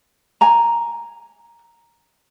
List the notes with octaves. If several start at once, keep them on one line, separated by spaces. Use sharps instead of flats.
G#5 A#5